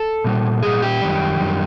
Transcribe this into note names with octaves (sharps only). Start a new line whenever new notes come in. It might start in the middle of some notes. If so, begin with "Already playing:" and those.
Already playing: A4
A#2 G3
A#2 G3 G#4
G4
F#2 D#3 G3
F#2 D#3 G3